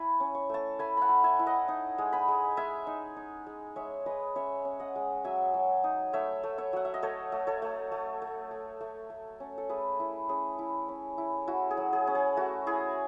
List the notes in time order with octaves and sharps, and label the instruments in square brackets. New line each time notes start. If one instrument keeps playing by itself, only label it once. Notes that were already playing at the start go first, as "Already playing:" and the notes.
Already playing: [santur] E4 G#5 B5
C#4
C#6
A3 A5 C#6
A3 G#5 B5
F#5 A5 B5
A3
E5 G#5
E4
D#5 F#5
D#4
G#3
G#5 B5
G#3
G#3 E5 G#5
D#4
D#4
G#3
G#3 C#5 E5
G#3 B4 D#5
C#4 C#5 E5
C#4
D#5 F#5
G#3
F#3 E5 G#5
F#3
D#4
A3 C#5 E5
A3
C#5 E5
F#3 F#5
E5
D#5
A3 A4 C#5
A3
A4 C#5
A3
A3
A3
A3
A3
A3
C#4
A4
A3 G#4 B4
E4
C#4 G#4
E4
C#4
E4
E4 F#4
G#4
F#3
G#4
C#4
G#4
A3 F#4
E4 G#4